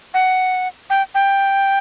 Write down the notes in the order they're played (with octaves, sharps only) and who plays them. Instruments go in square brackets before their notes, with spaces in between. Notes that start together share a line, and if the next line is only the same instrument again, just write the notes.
[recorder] F#5
G5
G5